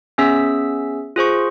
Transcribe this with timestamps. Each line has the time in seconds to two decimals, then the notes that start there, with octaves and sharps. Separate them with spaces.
0.18 B3 C#4 G#4 E5 E6 B6
1.16 F4 G#4 C5 C#6